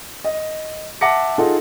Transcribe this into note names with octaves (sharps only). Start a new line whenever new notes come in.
D#5
E5 F#5 A5 D6 A#6 C#7
D#4 F4 G#4 A4 F#5